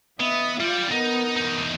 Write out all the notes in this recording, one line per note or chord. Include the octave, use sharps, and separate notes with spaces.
B3 D#5 E5
G3 F4 D5
B3 D#4 A#4
E2 D#4